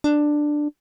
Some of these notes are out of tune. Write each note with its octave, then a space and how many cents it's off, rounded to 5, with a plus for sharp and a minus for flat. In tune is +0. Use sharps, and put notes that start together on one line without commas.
D4 +10